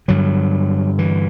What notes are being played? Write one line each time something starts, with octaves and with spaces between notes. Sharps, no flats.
G2 D3 F#3
E3